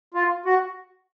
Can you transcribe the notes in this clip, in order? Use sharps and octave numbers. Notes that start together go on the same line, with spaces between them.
F4
F#4